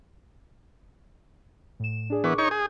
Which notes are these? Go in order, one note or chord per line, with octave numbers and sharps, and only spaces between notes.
A2 E7
D4 G#4 D5
E3 B3 A#4 C#6 D6
D#4 C#5 C#6 G6
G#4